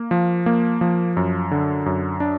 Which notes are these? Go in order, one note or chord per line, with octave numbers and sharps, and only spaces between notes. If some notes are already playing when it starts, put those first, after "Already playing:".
Already playing: A#3
F3
A#3
F3
F#2
D3
F#2
D4